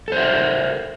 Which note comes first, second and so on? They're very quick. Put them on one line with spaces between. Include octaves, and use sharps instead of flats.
A4 C5 E5 A#4